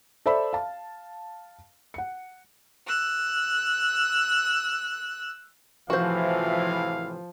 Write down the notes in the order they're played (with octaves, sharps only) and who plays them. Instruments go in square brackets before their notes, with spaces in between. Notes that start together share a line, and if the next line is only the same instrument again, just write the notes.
[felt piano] A4 C5 D5 E5 B5
F5 A5
F#5 C#7
[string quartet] E6 F#6
[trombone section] A2 C3 E3 [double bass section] F3 [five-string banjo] F#4 C5 [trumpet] F5